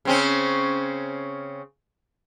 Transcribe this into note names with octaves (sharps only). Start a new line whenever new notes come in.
C#3 C4 C#4